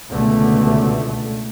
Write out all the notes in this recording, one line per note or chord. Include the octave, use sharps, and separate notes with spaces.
C#2 B2 D3 A3